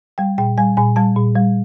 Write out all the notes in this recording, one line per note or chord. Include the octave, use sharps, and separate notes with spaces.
G3 G5
A#2 G5
G3 G#5
A#2 G#5
G3 A5
A#2
G3